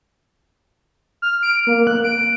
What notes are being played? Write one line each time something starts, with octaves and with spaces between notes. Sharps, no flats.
F6
D7
A#3
F#6
D7